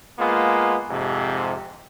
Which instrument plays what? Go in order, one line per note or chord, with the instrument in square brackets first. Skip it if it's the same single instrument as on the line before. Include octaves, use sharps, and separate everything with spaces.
[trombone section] G#3 A#3 B3 F4
F2 G#2 C3